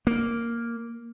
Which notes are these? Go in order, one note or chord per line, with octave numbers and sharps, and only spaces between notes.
A#3